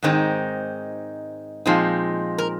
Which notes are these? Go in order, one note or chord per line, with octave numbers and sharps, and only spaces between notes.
G#2 D#3 G#3 C4 D#4
A#2 F3 G#3 C4 D#4
A#4